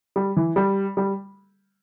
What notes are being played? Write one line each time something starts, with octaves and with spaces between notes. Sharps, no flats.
G3
E3
G3
G3